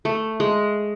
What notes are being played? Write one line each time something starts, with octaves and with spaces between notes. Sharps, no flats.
A3
G#3